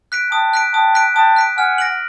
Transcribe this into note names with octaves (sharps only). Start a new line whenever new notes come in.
F#6 B6 D7
G5 A5 D#6
F#6 B6 D7
G5 A5 D#6
F#6 B6 D7
G5 A5 D#6
F#6 B6 D7
F#5 G#5 F6
A#6 D7 F#7